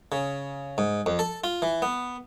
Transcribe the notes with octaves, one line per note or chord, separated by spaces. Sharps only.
C#3
G#2
F2
A4
F4
E3
B3